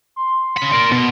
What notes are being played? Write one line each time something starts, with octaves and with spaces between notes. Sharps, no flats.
C6
C#3 B5
A#4 D5
B2 B3